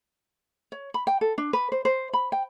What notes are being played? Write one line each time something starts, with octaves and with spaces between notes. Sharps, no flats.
C#5
B5
G5
A4
D4
B4
C5
C5
B5
G5